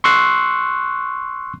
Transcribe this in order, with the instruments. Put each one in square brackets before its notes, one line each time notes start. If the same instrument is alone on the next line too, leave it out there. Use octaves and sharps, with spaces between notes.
[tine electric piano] C6 C#6 E6 F#6 C7